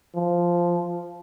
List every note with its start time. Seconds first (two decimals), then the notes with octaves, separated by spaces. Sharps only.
0.15 F3